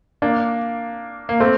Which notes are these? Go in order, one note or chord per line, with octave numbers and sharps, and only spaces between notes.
A#3 D4
A#3
A3 C4